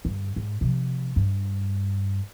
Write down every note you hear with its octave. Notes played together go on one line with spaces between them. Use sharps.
G2 D3
G#2
C3 F3
G2